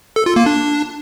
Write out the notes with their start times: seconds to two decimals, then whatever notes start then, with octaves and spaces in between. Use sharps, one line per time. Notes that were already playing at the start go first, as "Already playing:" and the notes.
0.16 A4
0.26 F4
0.36 A#3
0.46 D4